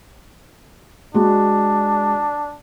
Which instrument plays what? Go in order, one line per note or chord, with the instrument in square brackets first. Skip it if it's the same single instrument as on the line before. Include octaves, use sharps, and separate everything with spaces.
[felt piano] G#3 F#4 [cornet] D4